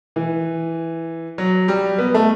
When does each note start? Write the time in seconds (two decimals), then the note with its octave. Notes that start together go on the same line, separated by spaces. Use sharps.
0.16 E3
1.38 F#3
1.68 G3
1.98 B3
2.14 A3